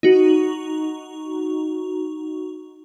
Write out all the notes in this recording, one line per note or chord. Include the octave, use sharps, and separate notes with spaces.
D#4 F#4